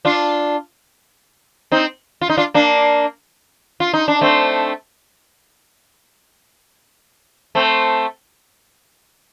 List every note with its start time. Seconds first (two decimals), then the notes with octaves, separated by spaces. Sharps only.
0.05 D4 F4
1.72 C4 D#4
2.21 F4
2.29 D#4
2.37 D4 F4
2.54 A#3 D4
3.80 F4
3.93 D#4
4.08 D4
4.21 A3 C4
7.55 A3 C4